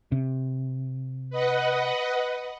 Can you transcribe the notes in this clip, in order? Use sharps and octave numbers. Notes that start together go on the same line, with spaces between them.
C3
B4 D#5 F#5